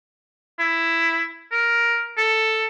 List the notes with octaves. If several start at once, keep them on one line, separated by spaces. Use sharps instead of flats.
E4
A#4
A4